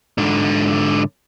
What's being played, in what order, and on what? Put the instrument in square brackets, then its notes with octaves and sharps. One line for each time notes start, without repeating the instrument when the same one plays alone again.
[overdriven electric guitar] G#2 D3